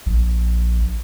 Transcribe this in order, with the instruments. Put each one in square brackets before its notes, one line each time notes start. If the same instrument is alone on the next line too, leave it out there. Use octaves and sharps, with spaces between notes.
[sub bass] A#1